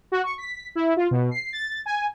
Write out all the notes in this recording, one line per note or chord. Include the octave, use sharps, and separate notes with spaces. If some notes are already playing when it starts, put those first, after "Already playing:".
F#4
C#6
B6
E4
F4
B2
C7
A6
G#5